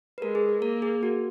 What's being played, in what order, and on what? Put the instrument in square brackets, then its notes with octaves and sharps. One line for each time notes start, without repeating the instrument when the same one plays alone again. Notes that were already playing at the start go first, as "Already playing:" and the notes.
[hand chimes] B4
[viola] G#3 [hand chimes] A#4
[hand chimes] G#4
A#4
[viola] A#3 [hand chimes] A#4
[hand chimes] G#4
F#4